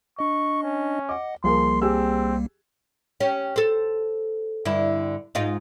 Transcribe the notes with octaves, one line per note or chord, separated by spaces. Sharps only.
D4 D#5 C#6
C#4
D#5 F#5 D6
C2 F3 G3 A#3 G#4 A#4 C6
C4 G4 G#4 E6
C#4 G4
A4 C5
G2 D3 E4
G#2 D#4 F4